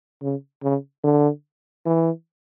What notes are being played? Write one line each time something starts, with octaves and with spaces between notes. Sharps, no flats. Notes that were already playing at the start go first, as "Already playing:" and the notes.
C#3
C#3
D3
E3